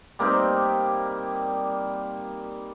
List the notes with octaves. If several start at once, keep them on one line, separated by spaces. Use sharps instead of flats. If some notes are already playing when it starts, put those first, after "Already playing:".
G3 A#3 C4 D#4